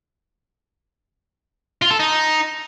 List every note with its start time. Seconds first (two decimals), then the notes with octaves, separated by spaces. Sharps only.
1.82 F4
1.91 A4
1.99 D#4